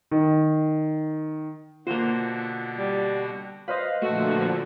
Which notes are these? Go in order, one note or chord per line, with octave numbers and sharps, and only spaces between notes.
D#3
B2 D3 A#3 F4 F#4 C5
G3
B4 C5 D#5 F5
A#2 D3 F3 A3 F#4